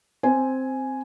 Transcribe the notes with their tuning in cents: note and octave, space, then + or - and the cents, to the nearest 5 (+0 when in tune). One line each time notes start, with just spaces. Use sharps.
C4 +0 C5 +0 G#5 +0